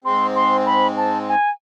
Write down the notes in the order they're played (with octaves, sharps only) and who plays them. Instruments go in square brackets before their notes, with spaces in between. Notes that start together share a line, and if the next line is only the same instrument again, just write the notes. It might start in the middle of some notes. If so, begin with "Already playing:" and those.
[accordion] G#2 G#3 C4 [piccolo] C6
[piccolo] C6
B5
A5
G#5